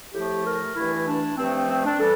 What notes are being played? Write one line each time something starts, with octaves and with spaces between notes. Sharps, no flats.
A2 F3 A3 G4
A#4
G2 E3 A3 E4
D4
G2 F3 A3 C4
C4
C4
D4
E3 G3 A4